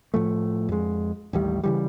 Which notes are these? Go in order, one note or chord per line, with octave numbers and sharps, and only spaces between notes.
A2 F3 A3
F2 G#3
A1 D#2 G3
C#3 E3 G3